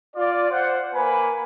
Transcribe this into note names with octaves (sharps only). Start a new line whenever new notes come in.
F4 D5
C5 F#5
A#3 B4 G#5 B5